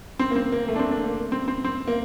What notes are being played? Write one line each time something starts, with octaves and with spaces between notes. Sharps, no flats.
C4
A#3
C4
A#3
A3
D4
C4
D4
A#3
C4
C4
C4
A#3